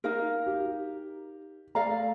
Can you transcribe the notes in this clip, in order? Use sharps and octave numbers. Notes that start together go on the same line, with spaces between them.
D#4 A#4 F5
G4
A3 A4 D5 F5 A#5